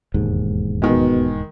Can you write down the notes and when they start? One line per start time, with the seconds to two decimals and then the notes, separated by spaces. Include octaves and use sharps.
0.14 E1 D#2 G#2
0.82 B2 D#3 G#3